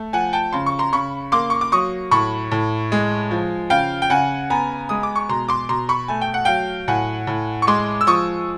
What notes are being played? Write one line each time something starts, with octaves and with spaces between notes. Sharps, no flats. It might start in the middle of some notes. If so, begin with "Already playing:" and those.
Already playing: A3
F3 F#5 G#5
G5 A5
C#3 C6
C#6
A#5 C6
C#3 B5 C#6
A#3 C6 D6
C#6
D6
F#3 C#6 D#6
A2 B5 C#6
A2
G#3
F3
C#3 F5 G5
G5
C#3 F#5 G#5
B3 G#5 A#5
G#3 D#6
D6
C#6
B2 A#5 C6
C6 D6
B2 A#5 C6
B5 C#6
A3 G#5
G5
F#5
F#3 F5 G5
A2 F#5 G#5
A2
C#6
G#3 C6 D6
E6
F3 C#6 D#6